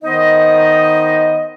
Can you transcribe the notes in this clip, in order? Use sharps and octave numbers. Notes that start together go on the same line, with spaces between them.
D#3 B3 D#4 C5 D#5